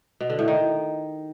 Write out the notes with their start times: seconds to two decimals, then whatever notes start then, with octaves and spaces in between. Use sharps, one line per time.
0.21 B2
0.30 D3
0.39 A2
0.48 D#3